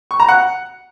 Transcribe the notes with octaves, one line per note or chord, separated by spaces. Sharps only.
C#6
A#5
F#5